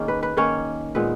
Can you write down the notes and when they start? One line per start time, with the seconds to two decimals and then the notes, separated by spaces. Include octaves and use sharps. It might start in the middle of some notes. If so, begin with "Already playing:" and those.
Already playing: D#3 A#3 C#4 G#4
0.08 B4
0.23 B4
0.37 D#3 A#3 C#4 C#5
0.95 A#2 G#3 B3 B4